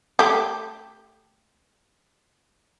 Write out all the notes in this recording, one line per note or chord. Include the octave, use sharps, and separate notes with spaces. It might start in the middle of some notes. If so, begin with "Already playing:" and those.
A3 G4